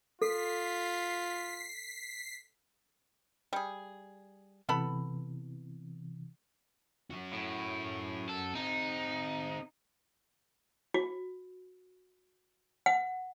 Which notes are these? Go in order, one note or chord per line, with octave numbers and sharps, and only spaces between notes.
F4 A4 B6 C7
G3 G#4
C3 E3 B3 A4 B5
C#4 F#4
A2
A4
C4 D#4 G#4
F#4
F#5